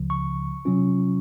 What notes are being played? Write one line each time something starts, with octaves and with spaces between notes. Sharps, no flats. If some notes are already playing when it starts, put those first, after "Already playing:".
Already playing: C#2 C#3 F3
C#6
C3 F#3 C#4 F4